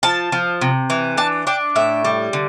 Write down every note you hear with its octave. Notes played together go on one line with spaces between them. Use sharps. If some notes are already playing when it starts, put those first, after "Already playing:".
F3 A5
F3
C3
E3
D4 A5
D4 G5
A2 E5
G3
D3